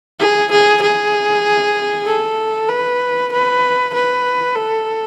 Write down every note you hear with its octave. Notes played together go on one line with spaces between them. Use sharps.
G#4
G#4
G#4
A4
B4
B4
B4
A4